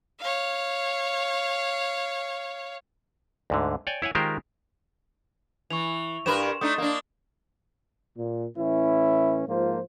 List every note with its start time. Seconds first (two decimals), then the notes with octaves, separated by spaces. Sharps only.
0.18 C#5 F5
3.50 D2 G#2 D3
3.87 C#5 D5 G5 G#5
4.02 E4 C#5 F#5 G#5
4.15 D#3 G#3 F4 G4 A#4 C5
5.70 E3 C#6 F7
6.26 G2 A#4 B4 C6 E7
6.61 A3 D4 D#4 D#6
6.78 A#3 D4
8.17 A#2
8.56 A2 E3 C#4 E4
9.47 G#2 F3 A#3 F4 C5